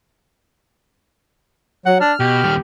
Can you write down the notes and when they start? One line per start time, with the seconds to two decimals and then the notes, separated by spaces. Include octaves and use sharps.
1.86 F#3 F#5
2.01 D4 F6
2.20 B2 G4
2.43 D#2 G3